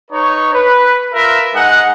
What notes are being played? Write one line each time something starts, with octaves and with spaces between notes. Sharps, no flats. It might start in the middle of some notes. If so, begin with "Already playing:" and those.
D#4 B4 C#5
B4
F4 A#4 B4 E5
G#3 D#4 F#5